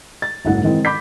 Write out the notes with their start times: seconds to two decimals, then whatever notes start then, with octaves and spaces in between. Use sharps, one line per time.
0.22 A6
0.45 F#1 B1 G#2 E4 F#5
0.63 D#3 E3 G#3 C4 D#4 E4
0.85 B5 D6 G6 B6